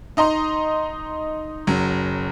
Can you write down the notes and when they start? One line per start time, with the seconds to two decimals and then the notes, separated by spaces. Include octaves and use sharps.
0.17 D#4 D#5 A#5 C6
1.67 F#1 F#3